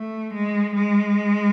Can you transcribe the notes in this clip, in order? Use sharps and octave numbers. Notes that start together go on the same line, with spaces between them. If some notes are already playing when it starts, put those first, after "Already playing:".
Already playing: A3
G#3
G#3